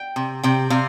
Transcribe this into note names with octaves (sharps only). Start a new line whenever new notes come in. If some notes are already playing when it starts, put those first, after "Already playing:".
Already playing: G5
C3
C3 G5
C3 F5